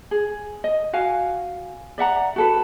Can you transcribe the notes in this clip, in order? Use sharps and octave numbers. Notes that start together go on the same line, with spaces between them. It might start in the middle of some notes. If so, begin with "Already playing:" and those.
G#4
D#5
F#4 F5 G#5
D5 E5 F#5 A#5
F#4 A4 B4